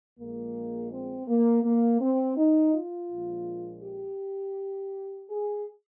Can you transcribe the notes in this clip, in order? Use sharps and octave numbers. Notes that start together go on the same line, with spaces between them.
A#1 A#2 G#3 A#3
C4
A#3
A#3
C4
D#4
F4
A#1 A#2 F3 G#3
G4
G#4